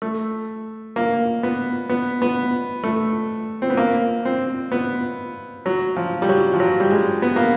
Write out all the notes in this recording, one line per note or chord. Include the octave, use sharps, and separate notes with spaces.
A3
A#3
B3
B3
B3
A3
C4
B3
A#3
C4
B3
F#3
F3
G3
F#3
F3
F#3
G3
G#3
B3
A#3